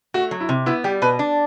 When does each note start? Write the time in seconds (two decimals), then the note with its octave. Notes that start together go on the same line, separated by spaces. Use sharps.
0.14 A3 F#4
0.31 F#3
0.40 E4
0.49 C3
0.66 B3 E4
0.84 G3 G4
1.02 B2 B4
1.19 D4